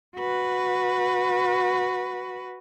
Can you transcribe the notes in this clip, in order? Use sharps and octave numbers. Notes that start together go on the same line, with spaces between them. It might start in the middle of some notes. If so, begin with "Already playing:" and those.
F#4 B4